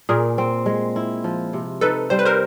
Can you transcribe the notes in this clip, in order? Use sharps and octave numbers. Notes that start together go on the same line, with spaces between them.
A#2 G#4 A#4
C4
G#3
E4
F3
C3
D#4 A4 B4
G3 C5
B4
A#4 C5